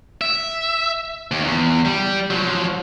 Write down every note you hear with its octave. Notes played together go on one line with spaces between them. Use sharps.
E5
D#2
E2
G3
F3 F#3